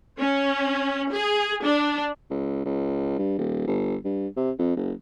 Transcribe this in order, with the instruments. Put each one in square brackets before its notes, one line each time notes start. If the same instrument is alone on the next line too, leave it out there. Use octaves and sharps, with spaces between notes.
[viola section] C#4
G#4
D4
[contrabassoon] C#2
C#2
G2
D#1
G1
G2
C3
F2
F#1